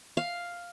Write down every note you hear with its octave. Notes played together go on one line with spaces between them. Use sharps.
F5